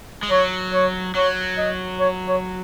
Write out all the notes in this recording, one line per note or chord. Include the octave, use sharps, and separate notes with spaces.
G#3
F#3 C#5
C#5
F#3 C#5
D#5
C#5
C#5